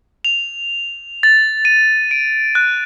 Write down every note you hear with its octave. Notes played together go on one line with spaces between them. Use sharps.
F7
A6
D#7
D7
F#6